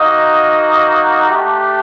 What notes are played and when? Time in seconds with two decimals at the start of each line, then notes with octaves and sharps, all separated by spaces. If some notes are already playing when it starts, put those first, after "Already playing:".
Already playing: A#3 D#4 F#4 D#5
1.28 A3 D4 G4